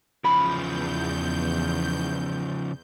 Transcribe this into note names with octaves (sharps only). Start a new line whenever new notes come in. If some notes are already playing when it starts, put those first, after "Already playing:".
E2 C#3 F3 B5 G6